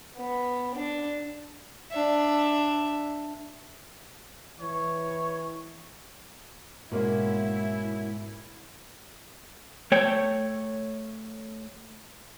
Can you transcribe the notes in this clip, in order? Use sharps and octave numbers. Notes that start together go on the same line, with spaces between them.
B3
D4
D4 E5
E3 C#5
G#2 B2 G#3 A#3 C#4 E4 F#4
A3 C#5 G5